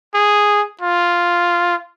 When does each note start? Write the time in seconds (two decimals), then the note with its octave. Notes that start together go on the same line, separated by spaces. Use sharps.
0.14 G#4
0.81 F4